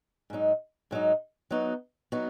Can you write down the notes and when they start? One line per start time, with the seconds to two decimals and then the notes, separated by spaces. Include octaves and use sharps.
0.30 G#2 F#3 D#4
0.91 G#2 F#3 D#4
1.51 F#3 B3 D#4 F#4
2.12 F#3 B3 D#4 F#4